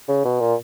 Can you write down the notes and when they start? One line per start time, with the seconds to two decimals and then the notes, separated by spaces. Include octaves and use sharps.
0.08 C#3
0.25 B2
0.40 A#2